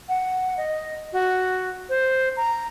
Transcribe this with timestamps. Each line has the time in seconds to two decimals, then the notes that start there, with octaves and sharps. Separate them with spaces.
0.09 F#5
0.57 D#5
1.13 F#4
1.89 C5
2.37 A#5